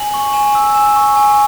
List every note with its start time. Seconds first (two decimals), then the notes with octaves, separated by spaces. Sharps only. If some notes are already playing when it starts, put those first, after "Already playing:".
Already playing: G#5 F#7
0.14 C#6
0.33 G#5 E7
0.55 E6
0.75 G#5 E7
0.96 C#6
1.16 G#5